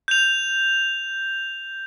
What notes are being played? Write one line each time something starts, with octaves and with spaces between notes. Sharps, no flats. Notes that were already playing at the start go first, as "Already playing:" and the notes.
G6 F7